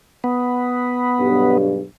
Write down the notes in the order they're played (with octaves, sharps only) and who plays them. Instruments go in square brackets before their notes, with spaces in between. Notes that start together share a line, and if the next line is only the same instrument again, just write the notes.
[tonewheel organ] B3
[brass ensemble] B1 G2